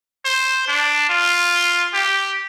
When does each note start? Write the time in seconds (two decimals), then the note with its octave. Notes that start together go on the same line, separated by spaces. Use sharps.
0.25 C5
0.68 D4
1.09 F4
1.94 G4